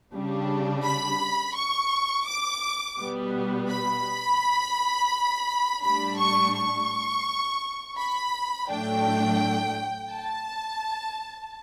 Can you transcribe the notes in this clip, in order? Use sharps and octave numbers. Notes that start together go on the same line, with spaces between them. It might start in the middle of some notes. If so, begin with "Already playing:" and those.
C#3 G3 D4
B5
C#6
D6
B2 G3 B3
B5
A2 G3 D4 B5
C#6
C#6
B5
A2 F#3 A3 D4 G5
A5